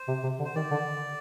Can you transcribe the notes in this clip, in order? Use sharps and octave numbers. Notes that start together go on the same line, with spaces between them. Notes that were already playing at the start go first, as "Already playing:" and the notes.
Already playing: C5
C3
C3
D3
C5
D#3 D5
D3